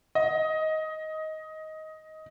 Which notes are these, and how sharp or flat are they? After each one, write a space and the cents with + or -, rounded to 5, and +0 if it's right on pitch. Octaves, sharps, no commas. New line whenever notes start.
D#5 +15